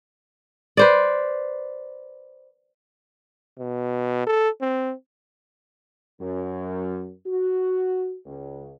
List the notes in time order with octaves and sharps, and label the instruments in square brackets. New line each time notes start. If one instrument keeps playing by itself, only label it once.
[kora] B4 C5 D5
[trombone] B2
A4
C4
[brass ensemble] F#2
F#4
C#2